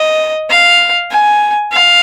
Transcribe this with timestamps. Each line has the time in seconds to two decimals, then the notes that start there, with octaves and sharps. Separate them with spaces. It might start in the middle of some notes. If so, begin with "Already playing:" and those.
Already playing: D#5
0.50 F5
1.11 G#5
1.72 F5